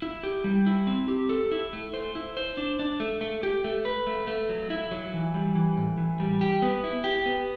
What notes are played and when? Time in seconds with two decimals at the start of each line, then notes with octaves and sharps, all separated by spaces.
0.02 E4
0.23 G4
0.44 G3
0.66 E4
0.87 C4
1.08 G4
1.29 A4
1.52 E4
1.73 A3
1.94 C5
2.15 E4
2.37 C5
2.57 D4
2.79 D4
3.00 A3
3.21 A3
3.43 G4
3.64 A3
3.85 B4
4.07 A3
4.27 A3
4.49 F#3
4.70 E4
4.91 F#3
5.13 E3
5.34 G3
5.55 E3
5.77 A2
5.97 E3
6.20 G3
6.41 G4
6.62 B3
6.84 E4
7.04 G4
7.26 B3